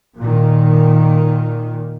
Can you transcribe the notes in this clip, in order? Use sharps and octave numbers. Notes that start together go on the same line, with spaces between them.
A#2 D#3